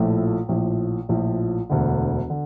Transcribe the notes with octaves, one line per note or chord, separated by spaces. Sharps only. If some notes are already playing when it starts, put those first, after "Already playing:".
Already playing: A#1 A2 F3 A3
A#1 A2 F3
A#1 A2 F3
E1 D2 D3
D3